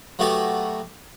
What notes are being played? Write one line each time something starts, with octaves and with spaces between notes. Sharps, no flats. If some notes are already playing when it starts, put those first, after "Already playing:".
F#3 A3 B3 F#4 G4 A4